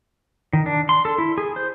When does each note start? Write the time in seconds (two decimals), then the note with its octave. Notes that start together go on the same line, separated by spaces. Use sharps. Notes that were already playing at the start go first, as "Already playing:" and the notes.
0.53 D#3
0.66 D4
0.89 C6
1.05 A4
1.18 E4
1.38 G#4
1.56 C5